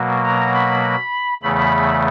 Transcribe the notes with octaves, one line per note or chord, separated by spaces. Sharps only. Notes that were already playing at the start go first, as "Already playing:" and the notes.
Already playing: B2 F#3 A#3
A#5
B5
E2 C#3 E3 A3 B5